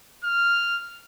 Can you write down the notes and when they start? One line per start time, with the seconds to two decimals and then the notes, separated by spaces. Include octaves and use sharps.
0.24 F6